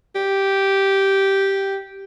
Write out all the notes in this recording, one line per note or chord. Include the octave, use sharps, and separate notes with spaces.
G4